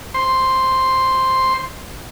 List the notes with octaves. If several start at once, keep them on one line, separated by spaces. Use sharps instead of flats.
C5 C6